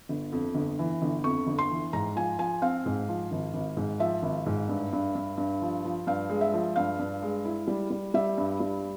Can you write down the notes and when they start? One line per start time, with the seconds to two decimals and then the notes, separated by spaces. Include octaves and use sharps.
0.09 G1
0.32 F2
0.55 G1
0.79 E3
1.02 G1
1.24 F2 C#6
1.47 G1
1.59 C6
1.70 E3
1.93 G#2 A#5
2.16 F3 G#5
2.39 F3 G#5
2.62 C4 F5
2.86 G#2
3.09 F3
3.31 G#1
3.54 G#1
3.77 G#2
4.00 F3 E5
4.23 G#1
4.46 G#2
4.69 G2
4.93 G2
5.15 G2
5.38 G2
5.62 F3
5.85 F3
6.07 G2 F5
6.29 G#3
6.41 E5
6.53 F3
6.76 G2 F5
6.99 G2
7.22 G#3
7.45 E4
7.67 G3
7.90 G3
8.14 G3 E5
8.38 G2
8.60 G3